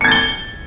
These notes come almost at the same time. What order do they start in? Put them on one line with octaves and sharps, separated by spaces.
C#7 G#6 A6 G7